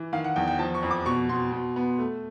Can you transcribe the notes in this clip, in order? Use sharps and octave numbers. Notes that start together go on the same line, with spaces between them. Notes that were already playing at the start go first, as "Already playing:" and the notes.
Already playing: E3
D#3 F5
F#5
E2 G5
G5
F3 A5
C#6
F2
D6
B2 C#6
B2 C6
B2
B3
A3